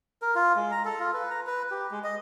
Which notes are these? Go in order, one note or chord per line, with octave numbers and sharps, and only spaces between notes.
A#4
F4
G#3
A#5
A4
F4
B4
A#5
B4
G4
G#3
D#5